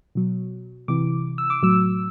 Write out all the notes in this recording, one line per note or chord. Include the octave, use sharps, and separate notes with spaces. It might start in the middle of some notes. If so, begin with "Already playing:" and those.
B2 F#3
C3 E3 D6
E6
D6
A2 F#3 E6